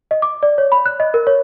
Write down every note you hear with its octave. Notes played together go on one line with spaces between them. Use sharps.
D#5
D6
D5
C#5
B5
F#6
D#5
A#4
C#5